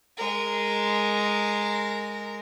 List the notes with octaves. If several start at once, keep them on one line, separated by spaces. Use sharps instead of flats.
G#3 A#4